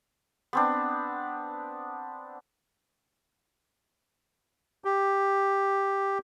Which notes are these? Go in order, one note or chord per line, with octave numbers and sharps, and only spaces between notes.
B3 C4 D4
G4